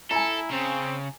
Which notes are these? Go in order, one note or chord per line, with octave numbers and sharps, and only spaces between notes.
E4 A4 G#5 A#5
C#3 C4